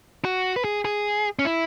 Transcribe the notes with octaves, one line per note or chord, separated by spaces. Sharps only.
F#4
B4
G#4
G#4
C#4
E4